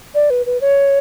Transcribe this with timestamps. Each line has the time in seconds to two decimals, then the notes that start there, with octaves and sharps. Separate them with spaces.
0.15 D5
0.30 B4
0.46 B4
0.61 C#5